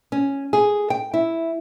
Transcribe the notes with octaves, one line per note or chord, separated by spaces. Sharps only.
C#4
G#4
G5
E4